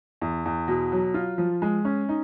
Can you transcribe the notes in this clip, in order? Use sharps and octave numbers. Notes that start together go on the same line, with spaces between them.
E2
E2
B2
F#3
F4
F3
G#3
C#4
D#4